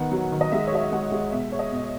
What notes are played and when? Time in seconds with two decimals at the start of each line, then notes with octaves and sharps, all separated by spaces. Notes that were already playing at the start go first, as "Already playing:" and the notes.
Already playing: D#3 B3 F#5
0.12 F#3
0.32 D#3
0.41 D#5
0.52 G#3 E5
0.67 C#5
0.72 F#4 D#5
0.84 E5
0.92 G#3 F#5
1.12 G#3
1.32 B2 E5
1.52 G#4 C#5
1.59 D#5
1.72 B2